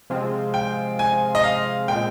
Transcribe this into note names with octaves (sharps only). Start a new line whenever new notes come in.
C3 F3 G#3 C4 F4
G5
G#5
D#5
F5
A#2 G#3 C4 G5